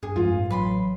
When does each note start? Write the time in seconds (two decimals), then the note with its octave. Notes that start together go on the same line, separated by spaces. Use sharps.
0.03 G2 G#4
0.16 F2 G#2 F4
0.34 A1
0.51 F#3 B4 B5 C6